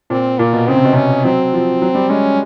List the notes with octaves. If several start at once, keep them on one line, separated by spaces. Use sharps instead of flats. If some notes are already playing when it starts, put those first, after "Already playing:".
A#2 C4
A#2 A#3
B2
C#3 C4
C3
B2
C3 C#4
F#3 C4
F3
F#3
G3
G#3 C#4